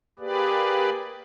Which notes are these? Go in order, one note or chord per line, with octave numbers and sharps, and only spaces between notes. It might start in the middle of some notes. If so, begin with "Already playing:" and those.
A#3 G4 G#4 B4 D5